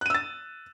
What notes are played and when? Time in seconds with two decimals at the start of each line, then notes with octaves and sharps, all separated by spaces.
0.01 F#6
0.06 D#7
0.10 E6
0.14 A6